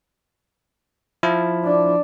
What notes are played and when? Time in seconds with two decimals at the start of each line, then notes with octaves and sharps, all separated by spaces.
1.23 F3 E4
1.64 D4